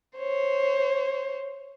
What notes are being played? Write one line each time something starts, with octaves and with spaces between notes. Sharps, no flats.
C5 C#5